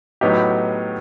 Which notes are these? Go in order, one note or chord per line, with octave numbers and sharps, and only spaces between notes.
A2 F#3 B3 D#4 G4